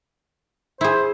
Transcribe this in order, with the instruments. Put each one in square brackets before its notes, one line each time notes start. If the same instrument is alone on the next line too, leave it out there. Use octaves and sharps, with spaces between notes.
[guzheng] E4 G#4 [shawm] C5